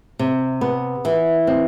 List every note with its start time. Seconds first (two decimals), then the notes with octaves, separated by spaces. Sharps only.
0.19 C3
0.61 B3
1.05 E3
1.47 C4